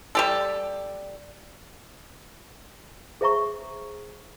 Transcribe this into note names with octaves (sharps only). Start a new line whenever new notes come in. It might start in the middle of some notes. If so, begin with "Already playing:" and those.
G3 G4 A4
G#4 C5 E5 A#5 C#6